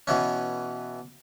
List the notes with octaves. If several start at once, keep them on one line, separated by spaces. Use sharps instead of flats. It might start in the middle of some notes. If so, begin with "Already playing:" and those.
B2 E3 C#4